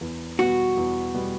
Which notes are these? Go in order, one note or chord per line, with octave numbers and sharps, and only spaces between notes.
E2
B2 G3 B3 F#4
E2
B2 G3 B3